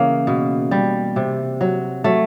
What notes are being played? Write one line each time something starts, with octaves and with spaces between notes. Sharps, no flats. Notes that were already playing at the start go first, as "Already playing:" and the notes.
Already playing: C#3 E3 A#3
B2
G3
C3
F#3
F#3 A3